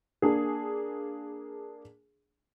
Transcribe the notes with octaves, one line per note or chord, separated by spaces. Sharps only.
A#3 D4 G#4